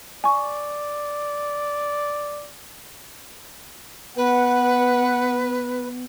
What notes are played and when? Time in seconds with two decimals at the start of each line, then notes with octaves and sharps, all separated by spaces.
0.24 D5 G#5 C#6
4.16 B3 B4 F#5